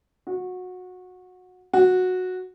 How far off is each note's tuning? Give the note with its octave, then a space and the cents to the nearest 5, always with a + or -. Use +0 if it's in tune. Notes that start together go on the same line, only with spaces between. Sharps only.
F#4 -20
F#4 -10